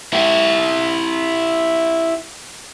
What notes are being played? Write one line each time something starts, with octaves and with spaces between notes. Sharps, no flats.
E4 G4